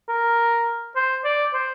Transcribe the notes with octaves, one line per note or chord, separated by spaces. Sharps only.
A#4
C5
D5
C5